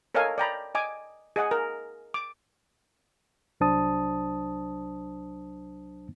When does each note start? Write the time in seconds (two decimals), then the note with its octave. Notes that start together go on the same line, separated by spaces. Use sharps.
0.15 A4 A#4 C#5 D#5 F5 G#5
0.38 D5 G5 A#5 B5
0.75 D#5 G#5 D6
1.36 G#4 D#5 F#5 G#5
1.51 A#4
2.14 D6
3.60 C2 F#3 D4 C5 A5 D#6